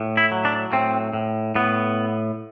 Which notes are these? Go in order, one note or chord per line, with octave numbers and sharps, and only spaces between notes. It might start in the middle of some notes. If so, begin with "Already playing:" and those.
Already playing: A2
E4
F#3
D4
A2 C4
A2
A2 B3